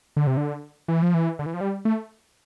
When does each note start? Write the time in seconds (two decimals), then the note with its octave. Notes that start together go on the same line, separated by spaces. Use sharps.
0.17 D3
0.27 C3
0.37 D3
0.88 E3
1.02 F3
1.14 E3
1.39 D3
1.46 E3
1.54 F3
1.61 G3
1.85 A3